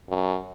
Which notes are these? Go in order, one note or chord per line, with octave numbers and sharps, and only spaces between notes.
F#2